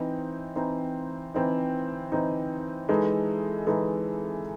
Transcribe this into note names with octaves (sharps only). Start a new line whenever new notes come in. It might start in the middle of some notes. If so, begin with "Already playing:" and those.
Already playing: E3 C4 D#4
E3 C4 D#4
E3 C4 D#4
E3 C4 D#4
E3 G#3 D#4 A4
E3 G#3 D#4 A4